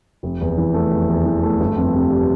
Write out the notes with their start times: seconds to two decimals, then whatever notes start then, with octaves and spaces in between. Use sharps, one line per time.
0.23 F1
0.41 E2
0.58 E3
0.74 A3
0.91 F1
1.09 E2
1.25 E3
1.43 A3
1.60 G1
1.76 F2
1.94 C3
2.10 G3